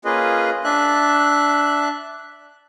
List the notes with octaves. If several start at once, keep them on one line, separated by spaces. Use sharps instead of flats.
A#3 C#4 F4 G#4 B4 D#5
D4 E5 F#6